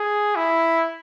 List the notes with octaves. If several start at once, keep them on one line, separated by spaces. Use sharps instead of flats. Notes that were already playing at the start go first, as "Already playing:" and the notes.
Already playing: G#4
E4